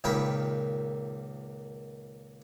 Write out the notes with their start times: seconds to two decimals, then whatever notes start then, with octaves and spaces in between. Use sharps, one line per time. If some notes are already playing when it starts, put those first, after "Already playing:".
0.04 C#2 A#2 D#3 G5 B5